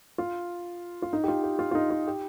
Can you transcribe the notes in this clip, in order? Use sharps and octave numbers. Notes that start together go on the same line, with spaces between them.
F4
F4
D#4
G4
F4
G4
F4
F4
D#4
F4
G4